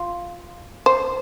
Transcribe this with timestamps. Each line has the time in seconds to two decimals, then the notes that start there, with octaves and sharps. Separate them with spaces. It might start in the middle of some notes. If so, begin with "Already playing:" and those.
Already playing: F4
0.86 C5